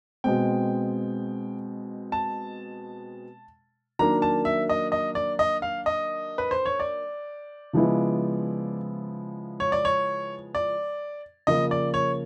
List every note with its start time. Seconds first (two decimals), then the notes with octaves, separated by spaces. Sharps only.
0.24 B2 G#3 C4 G5
2.12 A5
3.99 D#3 F#3 A#3 D4 A#5
4.22 A5
4.45 E5
4.69 D#5
4.92 D#5
5.15 D5
5.39 D#5
5.62 F5
5.86 D#5
6.38 B4
6.51 C5
6.66 C#5
6.80 D5
7.73 C#3 F3 G#3 B3 E4
9.60 C#5
9.72 D5
9.85 C#5
10.55 D5
11.47 C#3 F3 A#3 D#5
11.71 D5
11.94 C#5